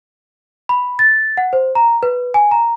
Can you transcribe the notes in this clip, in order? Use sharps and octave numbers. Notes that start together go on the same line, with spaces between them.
B5
A6
F#5
C5
A#5
B4
G#5
A#5